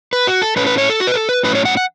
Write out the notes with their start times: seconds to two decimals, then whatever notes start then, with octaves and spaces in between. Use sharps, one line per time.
0.13 B4
0.27 F#4
0.42 A4
0.56 A2 A3 C#4 B4
0.67 B4
0.78 C#5
0.90 A4
1.00 F#4
1.07 B4
1.14 A4
1.29 B4
1.43 A2 F#3 C#4 B4
1.55 C#5
1.65 F#5
1.77 F#5